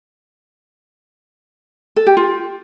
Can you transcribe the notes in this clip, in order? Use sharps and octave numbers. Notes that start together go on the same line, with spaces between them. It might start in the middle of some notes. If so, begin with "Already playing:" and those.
A4
G4
F4